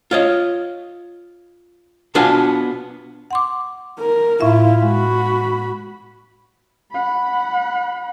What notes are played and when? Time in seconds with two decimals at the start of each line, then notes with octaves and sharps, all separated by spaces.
0.11 F4 C#5 D#5
2.15 B2 B3 D4 F4 G#5
3.31 F#5 C6 D6
3.99 A#4
4.41 A2 E4 F4 E5
4.83 G#3 F#4 B5
6.91 F#5 B5